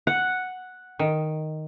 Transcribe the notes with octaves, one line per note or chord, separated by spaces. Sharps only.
F#5
D#3